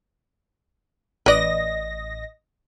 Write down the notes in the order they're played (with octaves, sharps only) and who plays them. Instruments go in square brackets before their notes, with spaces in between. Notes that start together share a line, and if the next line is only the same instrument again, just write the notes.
[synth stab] A1 D#5 A#6 [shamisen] B4 D5